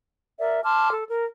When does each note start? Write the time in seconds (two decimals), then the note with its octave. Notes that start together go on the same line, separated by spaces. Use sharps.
0.38 A#4 D5 E5
0.63 A5 C6 D6 F6
0.91 A4
1.08 A#4